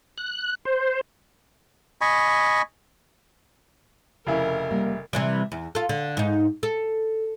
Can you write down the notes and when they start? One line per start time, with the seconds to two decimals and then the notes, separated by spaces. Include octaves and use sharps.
0.18 F#6
0.65 C5
2.01 D#5 G#5 B5 C#6
4.27 F1 C#3 E4 A#4
4.71 G3 A#3
5.13 C3 E3 G3
5.52 E2
5.75 F4 A4
5.89 D3
6.17 G#2 D#4
6.63 A4